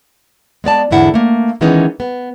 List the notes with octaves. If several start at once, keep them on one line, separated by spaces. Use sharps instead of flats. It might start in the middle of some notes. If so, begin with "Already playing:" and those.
G#3 B3 D5 A5
E2 G#2 D3 E4 F#5
A3 A#3
D#3 E3 G#3 B3 C#4 D#4
B3